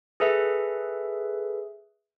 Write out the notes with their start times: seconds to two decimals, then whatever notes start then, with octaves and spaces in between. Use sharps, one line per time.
0.20 G#4 A4 B4 E5